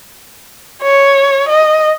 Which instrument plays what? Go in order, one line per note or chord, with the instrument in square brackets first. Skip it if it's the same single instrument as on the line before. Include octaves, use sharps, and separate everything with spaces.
[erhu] C#5
D#5